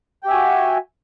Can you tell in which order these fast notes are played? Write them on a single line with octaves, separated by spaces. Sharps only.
G5 G4 E5 G#5 F#4